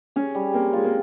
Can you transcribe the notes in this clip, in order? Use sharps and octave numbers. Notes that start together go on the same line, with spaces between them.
C#4 G#4
G3
A#3 C4
G#3 F4
A#3